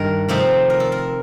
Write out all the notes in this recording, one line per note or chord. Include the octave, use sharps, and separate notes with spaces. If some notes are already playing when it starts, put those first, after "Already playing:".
Already playing: G2 D#3 G3 A#4
C3 F3 A3 C4 D#4
A#4
A4
A#4